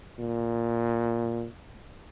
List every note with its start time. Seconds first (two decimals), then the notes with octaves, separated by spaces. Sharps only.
0.19 A#2